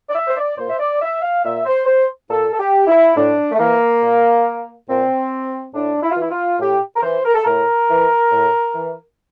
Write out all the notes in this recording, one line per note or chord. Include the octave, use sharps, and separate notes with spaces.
D5
E5
C5
D5
A#2 C5
E5
D5
E5
F5
A#2 E5
C5
C5
A#2 A4
A4
G4
E4
A2 D4
A3
E3 A#3
A#2
A#2 C4
A2 D4
E4
F4
E3 E4
F4
A2 G4
A#4
E3 C5
A#4
A4
A2 A#4
E3
A2
E3